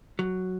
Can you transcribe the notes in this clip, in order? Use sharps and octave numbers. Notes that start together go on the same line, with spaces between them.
F#3